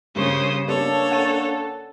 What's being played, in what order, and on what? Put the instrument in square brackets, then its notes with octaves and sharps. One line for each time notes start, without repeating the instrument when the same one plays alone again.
[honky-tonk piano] G2 A#3 C#6 [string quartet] C#3 [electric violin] C5 D#6
[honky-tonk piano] G3 B3 D5 [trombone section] A#3 C#4 D4 [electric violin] A4 [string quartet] C#5
[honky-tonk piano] F#5 A6 D#7